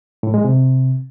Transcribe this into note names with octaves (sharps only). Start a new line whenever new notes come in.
A2
G#3
C3